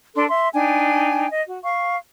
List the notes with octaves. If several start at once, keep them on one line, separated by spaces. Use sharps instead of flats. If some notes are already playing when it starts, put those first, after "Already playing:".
D4 A4 C6
E5 C6
D4 D#4 G5 G#5
D#5
F#4
F5 C#6